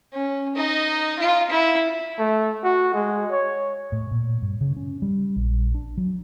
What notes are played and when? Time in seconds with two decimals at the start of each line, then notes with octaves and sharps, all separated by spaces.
0.12 C#4
0.56 D#4 D#5
1.19 F4
1.50 E4
2.18 A3
2.64 F#4
2.94 G#3
3.31 C#5
3.92 A2
4.11 A#2
4.42 G2
4.61 C#3
4.76 C#4
5.02 G3
5.36 A#1
5.75 D4
5.97 F#3